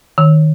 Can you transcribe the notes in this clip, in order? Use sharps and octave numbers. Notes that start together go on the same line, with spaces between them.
D#3